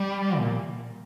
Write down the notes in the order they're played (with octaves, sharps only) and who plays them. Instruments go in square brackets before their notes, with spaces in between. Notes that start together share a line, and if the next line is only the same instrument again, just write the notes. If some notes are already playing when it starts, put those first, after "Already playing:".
Already playing: [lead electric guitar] G3
A#2